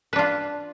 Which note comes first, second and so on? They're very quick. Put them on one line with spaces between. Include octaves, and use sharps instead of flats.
B4 D4 F4